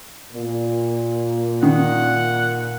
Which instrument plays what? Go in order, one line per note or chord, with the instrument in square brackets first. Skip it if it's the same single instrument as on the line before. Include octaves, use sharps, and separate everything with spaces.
[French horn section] A#2
[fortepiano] D#3 [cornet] F#5